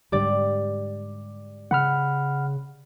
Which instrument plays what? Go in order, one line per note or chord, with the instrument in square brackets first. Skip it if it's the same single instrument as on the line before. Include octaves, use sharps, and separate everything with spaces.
[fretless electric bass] G#2 D3 G3 [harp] G4 D5
[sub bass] C#3 [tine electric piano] F#5 B5 F6